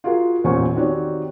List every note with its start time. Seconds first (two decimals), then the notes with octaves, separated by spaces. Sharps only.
0.04 F4 F#4 G#4 A#4 F5
0.44 A1 E2 A#2 C5 G#5 C#6
0.75 D#3 C4 F#4 G4 C#5 D5